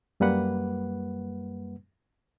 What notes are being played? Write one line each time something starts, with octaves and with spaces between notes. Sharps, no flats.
F#2 G3 A#3 B4 F#5